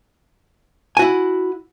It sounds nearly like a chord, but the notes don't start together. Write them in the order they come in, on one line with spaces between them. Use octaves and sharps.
G#5 F#4 E4